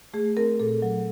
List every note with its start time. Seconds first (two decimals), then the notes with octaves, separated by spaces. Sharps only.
0.14 A3 G#4
0.37 C4 A#4
0.60 A#2 A4
0.82 F#3